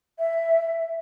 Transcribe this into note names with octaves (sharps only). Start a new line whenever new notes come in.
E5